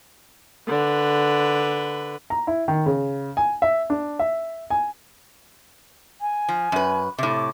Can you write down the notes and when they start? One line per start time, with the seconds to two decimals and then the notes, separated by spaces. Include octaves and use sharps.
0.68 D3 B4
2.30 A#5
2.47 E4
2.68 D#3
2.86 C#3
3.37 G#5
3.62 E5
3.90 D4
4.19 E5
4.70 G#5
6.21 G#5
6.49 F3
6.72 F#2 B4
7.18 A2 C3 D6